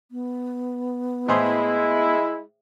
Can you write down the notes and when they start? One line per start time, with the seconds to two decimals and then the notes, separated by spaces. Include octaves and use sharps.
0.11 B3
1.29 A2 G#3 E4 G#4 C5